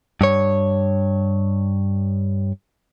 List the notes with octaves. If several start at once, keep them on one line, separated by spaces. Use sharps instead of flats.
G2 C#5